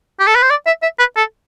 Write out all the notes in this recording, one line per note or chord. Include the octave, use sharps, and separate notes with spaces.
G4
A4
B4
C5
D5
E5
E5
B4
A4